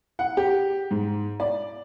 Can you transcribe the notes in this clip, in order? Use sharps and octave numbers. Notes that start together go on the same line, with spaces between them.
F#5
G4
G#2
D5